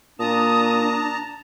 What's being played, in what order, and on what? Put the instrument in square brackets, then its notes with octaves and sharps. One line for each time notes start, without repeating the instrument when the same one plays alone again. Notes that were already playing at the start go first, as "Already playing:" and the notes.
[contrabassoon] A#2 [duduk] D4 [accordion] A5 A#5 [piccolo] D#6